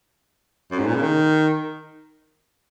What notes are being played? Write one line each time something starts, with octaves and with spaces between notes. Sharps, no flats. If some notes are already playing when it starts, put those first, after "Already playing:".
F#2
G#2
A#2
C#3
D#3